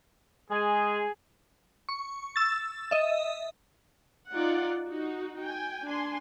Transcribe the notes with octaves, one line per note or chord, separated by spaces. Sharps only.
G#3 G#4
C#6
E6 A6
D#5 E5
D#4 F4 D5 F#5
D#4 F#4
G5 G#5
D4 G#5 C6